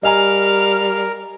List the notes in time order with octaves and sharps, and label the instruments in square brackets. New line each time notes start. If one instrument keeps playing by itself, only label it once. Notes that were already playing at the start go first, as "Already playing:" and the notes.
[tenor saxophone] G3 [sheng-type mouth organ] A#4 [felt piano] D#5 G#5 A#5 [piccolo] F5